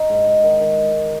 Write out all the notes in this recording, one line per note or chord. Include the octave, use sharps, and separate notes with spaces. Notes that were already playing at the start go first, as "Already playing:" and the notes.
Already playing: D#4
G#2
D#4
D#3
D#3